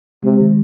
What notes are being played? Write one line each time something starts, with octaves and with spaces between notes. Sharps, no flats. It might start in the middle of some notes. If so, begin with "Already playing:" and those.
C3 G#3
D#3